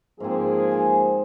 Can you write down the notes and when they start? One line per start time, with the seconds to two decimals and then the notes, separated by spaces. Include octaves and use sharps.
0.20 G#2 F3 A#3 C4 G#4
0.71 C5 G#5